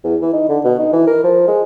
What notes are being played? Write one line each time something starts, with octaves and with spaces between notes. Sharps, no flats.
E2
E3
D#4
D3
B2
D#4
E3
A#4
F3
G#3